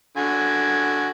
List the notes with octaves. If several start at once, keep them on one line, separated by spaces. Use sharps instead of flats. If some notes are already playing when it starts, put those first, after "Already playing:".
D3 F#4 G#5